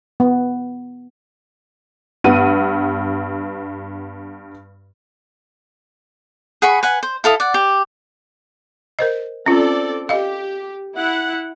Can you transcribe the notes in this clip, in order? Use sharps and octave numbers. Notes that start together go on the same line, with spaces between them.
B3
G2 B3 F#5 D#7
G#4 F#5 B5 C#6
B4 F#5 G#5
C5
E4 A4 F5 D#6
D5 F#5
G4
A#4 C5 D#5
C4 C#4 F4 A4 D5
G4 D#5 F5
E4 F#5